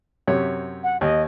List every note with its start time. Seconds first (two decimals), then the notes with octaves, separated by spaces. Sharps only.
0.28 F#2 C3 C#5
0.84 F#5
1.01 D#2 D#5